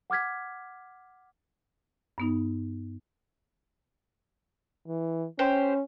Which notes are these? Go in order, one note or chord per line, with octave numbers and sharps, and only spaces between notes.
F#5 D6 F6 G#6 B6
G2 B3 D#4
E3
C#4 G4 C5